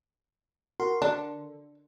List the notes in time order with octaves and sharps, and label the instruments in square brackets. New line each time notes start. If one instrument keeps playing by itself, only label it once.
[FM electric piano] F#4 A#4 C6
[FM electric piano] D3 [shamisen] D4